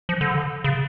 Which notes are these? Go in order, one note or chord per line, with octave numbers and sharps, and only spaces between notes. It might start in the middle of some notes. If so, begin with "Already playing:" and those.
F3
D3
C#3